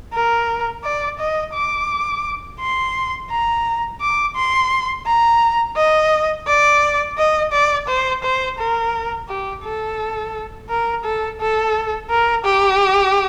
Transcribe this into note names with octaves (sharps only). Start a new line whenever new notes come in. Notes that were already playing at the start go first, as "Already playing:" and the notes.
A#4
D5
D#5
D6
C6
A#5
D6
C6
A#5
D#5
D5
D#5
D5
C5
C5
A#4
G4
A4
A#4
A4
A4
A#4
G4